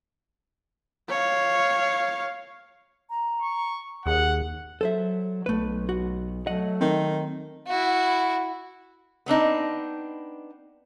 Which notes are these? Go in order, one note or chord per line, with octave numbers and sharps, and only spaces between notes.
C#5 F5
A#5
C#6
D#2 G#4 F#5
F#3 A4 C5 E5
B1 A3 B4
F#4
F#3 A3 D#5 F#5
D#3 C4
E4 F#4
B3 C4 D4 D#4